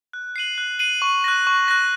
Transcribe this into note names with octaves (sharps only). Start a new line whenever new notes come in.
F#6
C7 D#7 F#7
F#6
C7 D#7 F#7
C#6
F#6 A#6
C#6
F#6 A#6